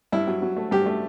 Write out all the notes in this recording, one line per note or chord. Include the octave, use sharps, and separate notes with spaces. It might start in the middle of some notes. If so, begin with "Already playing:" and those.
G2 E4
F#3
F#3
A3
G2 G4
A3